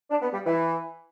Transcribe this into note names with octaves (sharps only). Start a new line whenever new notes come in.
D4
B3
G3
E3